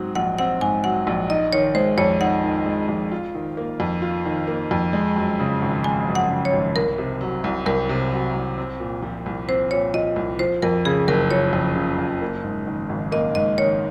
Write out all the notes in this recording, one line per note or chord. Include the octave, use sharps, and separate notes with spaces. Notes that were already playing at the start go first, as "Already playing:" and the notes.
Already playing: G#2 F#3 C4
A#1 F#5
C4 F#5
G#2 G#5
F#3 F#5
A#1
D#4 D#5
D#3 C#5
G#3 C5
F2 C#5
D#4 F#5
D#3
G#3
F2
F4
D#3
A#3
F2
F4
D#3
A#3
F2
G#3
F#2
C#3
G#1
G#3 G#5
F#2
F#5
C#3
C#5
G#1
C2 A#4
C3
F#3
C2
C2 A#4
C3
F#3
C2
C4
A#2
F3
C2
C4 C5
A#2 C#5
F3 D#5
C2
F3 C5
F2 A#4
C#3 G#4
F#1 A#4
F3 C#5
F2
C#3
F#1
A#3
G#2
D#3
G#1
A#3 D#5
G#2 D#5
D#3 C#5